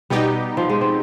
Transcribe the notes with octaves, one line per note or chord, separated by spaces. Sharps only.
B2 G3 B3 D#4 G4
F3
G#3
C4